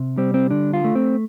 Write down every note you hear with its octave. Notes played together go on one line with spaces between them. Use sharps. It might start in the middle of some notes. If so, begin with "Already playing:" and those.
Already playing: C3
G3 C4
C4
D3 D4
F4
A3
C4